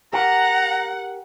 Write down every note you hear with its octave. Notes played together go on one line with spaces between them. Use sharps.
G4 A#4 F#5 A#5